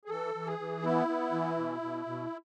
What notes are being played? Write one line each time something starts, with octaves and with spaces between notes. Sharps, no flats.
G#4
E3 A4
E3
G#4
E3
B3 E4
B3
E3
B2
B2
B2